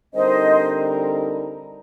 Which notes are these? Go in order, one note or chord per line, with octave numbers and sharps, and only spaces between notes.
D3 G3 C4 D#4 A#4 C5 D#5